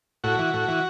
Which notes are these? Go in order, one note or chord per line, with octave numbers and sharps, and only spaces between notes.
A2 F#4
E3
A2
E3